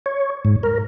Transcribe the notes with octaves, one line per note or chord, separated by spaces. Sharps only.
C#5
G#2
A#4